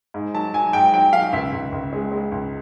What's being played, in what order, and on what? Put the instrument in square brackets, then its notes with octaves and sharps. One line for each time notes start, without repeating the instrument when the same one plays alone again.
[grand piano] G#2
F#3 A5
F#3 G#5
G#2 G5
F#3 G5
F#3 F5
C#2 E5
C#2
C#2
G#3
G#3
C#2